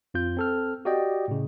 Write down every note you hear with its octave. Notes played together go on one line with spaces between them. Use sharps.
F2 C4 F4 G6
C4 A4 F6
F#4 G4 D5 D#5 G5
A2 C#3